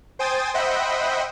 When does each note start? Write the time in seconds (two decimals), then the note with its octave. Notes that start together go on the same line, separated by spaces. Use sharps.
0.19 C5 G5 G#5 D#6 A6
0.54 C5 D#5 E5 F#5 G5 B5